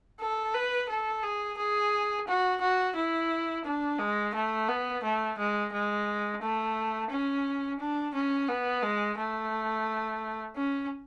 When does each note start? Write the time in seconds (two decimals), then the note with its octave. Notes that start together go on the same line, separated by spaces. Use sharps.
0.20 A4
0.54 B4
0.89 A4
1.23 G#4
1.57 G#4
2.28 F#4
2.61 F#4
2.96 E4
3.65 D4
3.99 G#3
4.34 A3
4.69 B3
5.03 A3
5.38 G#3
5.72 G#3
6.42 A3
7.10 C#4
7.80 D4
8.14 C#4
8.49 B3
8.83 G#3
9.18 A3
10.56 C#4